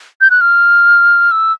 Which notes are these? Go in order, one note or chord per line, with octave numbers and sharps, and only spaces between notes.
G6
F#6
F6
E6